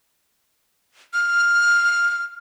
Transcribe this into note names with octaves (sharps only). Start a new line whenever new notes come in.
F6